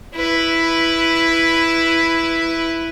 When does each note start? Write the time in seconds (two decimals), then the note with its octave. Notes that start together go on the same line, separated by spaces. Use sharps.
0.15 E4 B4